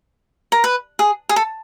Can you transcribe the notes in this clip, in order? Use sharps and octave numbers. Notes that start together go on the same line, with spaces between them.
A#4
B4
G#4
G#4
A4